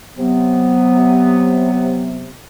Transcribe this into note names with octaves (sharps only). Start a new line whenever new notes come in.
C3 F#3 B3